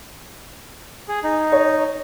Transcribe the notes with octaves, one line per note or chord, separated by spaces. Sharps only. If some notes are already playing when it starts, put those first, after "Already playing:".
G#4
D#4
C#5